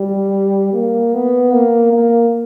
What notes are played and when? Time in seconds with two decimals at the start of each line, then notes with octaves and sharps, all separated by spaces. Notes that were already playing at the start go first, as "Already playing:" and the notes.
Already playing: G3
0.74 A#3
1.13 B3
1.53 A#3
1.92 A#3